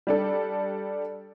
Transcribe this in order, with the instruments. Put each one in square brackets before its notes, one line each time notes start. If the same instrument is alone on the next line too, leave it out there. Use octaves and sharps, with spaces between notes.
[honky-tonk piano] G3 D4 A4